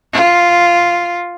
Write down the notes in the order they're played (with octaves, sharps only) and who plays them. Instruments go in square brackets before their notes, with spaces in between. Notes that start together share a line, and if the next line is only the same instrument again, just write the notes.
[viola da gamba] F4